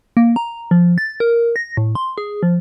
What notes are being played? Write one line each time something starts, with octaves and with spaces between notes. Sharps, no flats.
A#3
A#5
F3
A6
A#4
A#6
A2
C6
G#4
F3